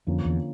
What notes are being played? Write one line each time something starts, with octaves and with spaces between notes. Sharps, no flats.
F2 D3 F3 A#3 C#4
E2